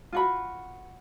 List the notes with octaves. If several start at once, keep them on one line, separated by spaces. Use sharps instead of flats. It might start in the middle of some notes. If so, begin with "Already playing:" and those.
F4 F#4 B5